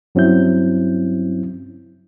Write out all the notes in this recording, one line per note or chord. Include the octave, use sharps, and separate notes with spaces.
G2 F#3 C4 C#4 E4 G6